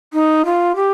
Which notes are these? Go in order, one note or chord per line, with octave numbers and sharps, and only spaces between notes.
D#4
F4
G4